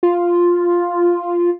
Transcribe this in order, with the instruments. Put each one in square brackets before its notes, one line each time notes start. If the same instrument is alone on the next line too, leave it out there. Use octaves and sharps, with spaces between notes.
[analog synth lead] F4